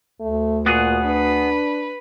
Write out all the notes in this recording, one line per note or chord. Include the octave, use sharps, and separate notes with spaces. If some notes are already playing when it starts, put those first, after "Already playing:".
D2 A3
A#2 B3 F#4 G#4
D4 B4